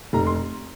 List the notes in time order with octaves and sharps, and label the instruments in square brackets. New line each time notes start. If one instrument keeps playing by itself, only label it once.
[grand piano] F1 A#5
C6